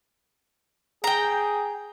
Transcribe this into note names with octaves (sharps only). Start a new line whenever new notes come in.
G#4 G5 A#5